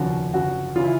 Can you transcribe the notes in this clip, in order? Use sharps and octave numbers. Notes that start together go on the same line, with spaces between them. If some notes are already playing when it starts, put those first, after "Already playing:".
Already playing: F1 D#2 C#3 F3 F#4
G1 F#2 C#3 F#4
C#3 E3 F4
E4